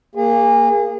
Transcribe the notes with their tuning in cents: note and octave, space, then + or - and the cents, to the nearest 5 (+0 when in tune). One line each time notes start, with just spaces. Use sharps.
A#3 +0 G#4 -30